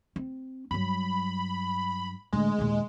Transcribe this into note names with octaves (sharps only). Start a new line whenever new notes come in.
C4
G2 F#3 B5
A2 D3 G#3
D#2 A#2